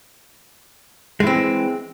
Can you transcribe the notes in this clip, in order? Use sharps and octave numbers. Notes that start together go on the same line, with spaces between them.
E3 G#3 C4